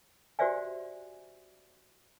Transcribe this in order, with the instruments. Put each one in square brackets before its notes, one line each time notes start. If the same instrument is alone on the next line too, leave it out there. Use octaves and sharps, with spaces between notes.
[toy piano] F#4 G4 C5 D5 E5 G#5